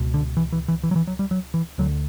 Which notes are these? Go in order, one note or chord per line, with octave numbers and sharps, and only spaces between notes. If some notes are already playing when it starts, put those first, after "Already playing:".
Already playing: C#2 B2
D3
E3
E3
E3
E3
F#3
E3
F#3
G3
F#3
E3
D2 D3 F#3